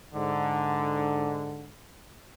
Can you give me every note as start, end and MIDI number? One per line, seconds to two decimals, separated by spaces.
0.14 1.72 44
0.14 1.72 50